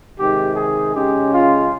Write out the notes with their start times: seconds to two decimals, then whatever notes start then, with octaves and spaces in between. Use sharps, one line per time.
0.18 C3 D#3 G#3 G4
0.56 G#4
0.94 C#3 G#3 C#4 G4
1.33 F4